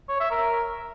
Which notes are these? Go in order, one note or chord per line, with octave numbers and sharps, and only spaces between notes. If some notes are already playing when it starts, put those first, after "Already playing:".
C#5
E5
A#4